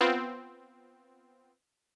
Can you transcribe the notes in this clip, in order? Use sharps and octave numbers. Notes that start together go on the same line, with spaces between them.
B3 C4 F4